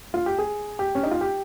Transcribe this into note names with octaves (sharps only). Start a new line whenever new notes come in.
F4
G4
G#4
G4
C#4
D#4
F4
G4